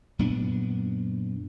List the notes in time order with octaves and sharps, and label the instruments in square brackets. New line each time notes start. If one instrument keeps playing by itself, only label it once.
[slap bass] F#2 A#2 B3 D4